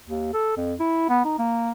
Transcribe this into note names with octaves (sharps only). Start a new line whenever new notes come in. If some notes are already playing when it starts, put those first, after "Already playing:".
D#2
A4
F2
E4
B3
D#4
A#3